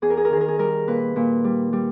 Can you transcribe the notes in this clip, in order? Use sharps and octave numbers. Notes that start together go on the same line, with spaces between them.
E2 G#4
A#4
G#4
A#4
D#3 G#4
A#4
G#4
G3 A#4
A#2 B4
A#2
G3
G3